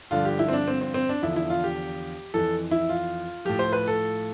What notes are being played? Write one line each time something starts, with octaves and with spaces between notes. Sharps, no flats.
G2 D3 F3 F4
G4
E4
C4
D4
C4
C4
C4
D4
E2 D3 F3 E4
E4
F4
G4
F2 E3 A4
E4
F4
A2 F3 G4
C5
B4
A4